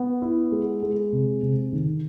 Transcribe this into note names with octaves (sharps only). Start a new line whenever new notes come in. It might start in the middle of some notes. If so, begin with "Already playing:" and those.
Already playing: B3
E4
G#3
G#3
C3
C3
D#3